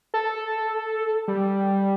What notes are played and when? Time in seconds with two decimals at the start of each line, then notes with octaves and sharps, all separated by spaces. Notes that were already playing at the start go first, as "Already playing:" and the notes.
0.14 A4
1.28 G3